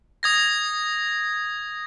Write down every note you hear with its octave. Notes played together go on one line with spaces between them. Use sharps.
D#6 G#6 A#6